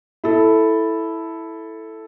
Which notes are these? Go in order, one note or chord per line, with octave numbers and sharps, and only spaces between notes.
E4 A4